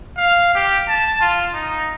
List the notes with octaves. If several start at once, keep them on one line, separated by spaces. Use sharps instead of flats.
F5
G4
A5
F4
D#4